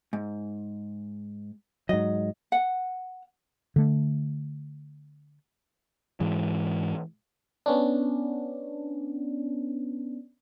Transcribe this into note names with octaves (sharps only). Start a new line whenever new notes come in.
G#2
G#2 F#3 D#5
F#5
D3 A3
G#2 E3 G#3
B3 C#4 D4